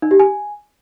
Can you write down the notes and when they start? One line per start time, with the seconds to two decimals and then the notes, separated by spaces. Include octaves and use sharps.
0.02 D#4
0.11 G4
0.19 G#5